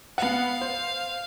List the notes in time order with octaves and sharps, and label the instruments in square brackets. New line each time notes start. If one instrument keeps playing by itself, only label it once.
[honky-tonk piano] B3 F#5 [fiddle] F5
[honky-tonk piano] C5